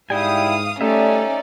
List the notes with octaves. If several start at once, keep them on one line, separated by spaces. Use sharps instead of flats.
G#2 G3 E4 F5 G5 G#5 D#6
G3 A3 C#4 D#4 D5 E5